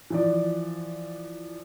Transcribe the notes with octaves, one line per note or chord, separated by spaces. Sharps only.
E3 F3 D5